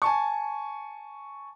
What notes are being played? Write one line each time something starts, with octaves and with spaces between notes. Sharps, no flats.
G#5 A5 C#6